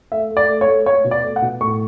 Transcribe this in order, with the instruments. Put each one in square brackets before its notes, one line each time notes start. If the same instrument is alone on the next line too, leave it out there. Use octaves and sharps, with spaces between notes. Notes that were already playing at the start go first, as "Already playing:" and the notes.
[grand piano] A3 E5
A3
D5
A3
C#5
A3
A3 C#5
B2
D5
A3
F#5
B2
A2 C#6